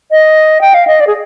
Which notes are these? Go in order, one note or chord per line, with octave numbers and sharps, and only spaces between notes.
D#5
G5
F5
D#5
D5
G#4